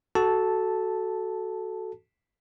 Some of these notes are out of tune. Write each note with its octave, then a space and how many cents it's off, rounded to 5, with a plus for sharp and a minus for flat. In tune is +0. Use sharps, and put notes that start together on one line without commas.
F#4 +10 A4 -10 A5 +0